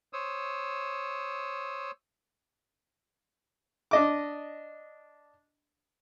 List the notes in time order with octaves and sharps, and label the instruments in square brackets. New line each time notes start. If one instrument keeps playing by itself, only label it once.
[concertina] C5 C#5 D#6 E6
[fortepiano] D4 D#5 D6